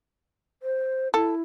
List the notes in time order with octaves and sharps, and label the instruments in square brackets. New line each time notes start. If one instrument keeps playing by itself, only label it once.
[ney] C5
[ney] E4 [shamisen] A4